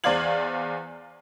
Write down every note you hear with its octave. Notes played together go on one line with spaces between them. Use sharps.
E2 C5 D5 F5 G#6 F#7